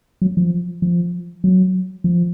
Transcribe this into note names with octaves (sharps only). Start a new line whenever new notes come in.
F#3
F3
F3
F#3
F3